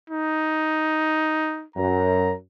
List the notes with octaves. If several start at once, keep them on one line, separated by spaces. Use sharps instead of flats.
D#4
F#2 A#5